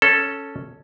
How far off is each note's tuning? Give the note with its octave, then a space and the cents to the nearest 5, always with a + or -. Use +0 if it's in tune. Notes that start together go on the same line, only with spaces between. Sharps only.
C#4 +0 A4 +0